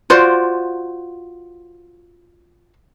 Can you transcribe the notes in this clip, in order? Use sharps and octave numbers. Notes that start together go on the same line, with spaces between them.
F4 F#4 C5 D5